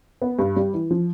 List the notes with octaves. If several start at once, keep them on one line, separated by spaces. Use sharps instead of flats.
B3
G2
G3
E3
F3